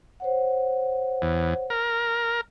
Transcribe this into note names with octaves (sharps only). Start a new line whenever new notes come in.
C5 C#5 F#5
E2
A#4